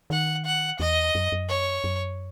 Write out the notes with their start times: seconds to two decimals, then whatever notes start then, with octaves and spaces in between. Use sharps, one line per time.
0.10 D#3 F#5
0.45 F#5
0.80 E2 D#5
1.15 F#2
1.32 F#2
1.49 C#5
1.84 F#2